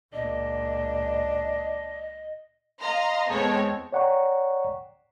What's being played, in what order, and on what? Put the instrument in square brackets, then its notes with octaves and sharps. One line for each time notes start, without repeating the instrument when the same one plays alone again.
[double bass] C#2 A#2 [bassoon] D4 [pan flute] D#5
[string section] D#5 F5 A#5 C6
E2 G#3 B3 C4 A4 C#5
[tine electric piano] C#5 D5 F#5 G5 A#5 C#6